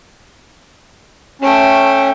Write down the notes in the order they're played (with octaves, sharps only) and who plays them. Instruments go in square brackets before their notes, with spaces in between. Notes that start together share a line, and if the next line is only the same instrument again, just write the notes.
[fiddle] A3 G5 [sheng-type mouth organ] C#4